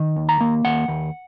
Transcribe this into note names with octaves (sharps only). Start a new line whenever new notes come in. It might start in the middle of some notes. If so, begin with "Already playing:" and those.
Already playing: D#3
D#2
A#5
A#3
D#2 F#5
D#2